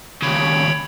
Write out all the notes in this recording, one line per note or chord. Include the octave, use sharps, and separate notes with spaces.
D#2 C#3 C#5 G5 B5